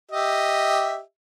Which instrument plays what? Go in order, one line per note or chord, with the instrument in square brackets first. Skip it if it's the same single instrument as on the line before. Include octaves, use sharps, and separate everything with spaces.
[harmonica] G4 D#5 E5